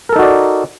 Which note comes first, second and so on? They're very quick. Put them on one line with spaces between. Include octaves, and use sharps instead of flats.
A#4 A4 D#4 F#4 D5